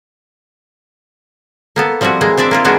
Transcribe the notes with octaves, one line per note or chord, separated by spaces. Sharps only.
A#3 B3 A4
F3 G3 C4 E4 F#4
E3 G#3 A#3
C4 D4 D5 E5
A#3 E4 F4
E3 G#3 A#3 B3 D4 F#4